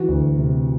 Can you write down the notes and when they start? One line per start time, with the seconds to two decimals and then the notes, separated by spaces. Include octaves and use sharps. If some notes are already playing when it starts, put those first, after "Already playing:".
Already playing: E3 F#4
0.08 D2
0.37 C3